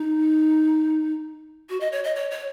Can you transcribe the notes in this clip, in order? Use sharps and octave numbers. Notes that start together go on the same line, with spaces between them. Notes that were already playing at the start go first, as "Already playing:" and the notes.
Already playing: D#4
F#4
D#5
C#5
D#5
C#5
C#5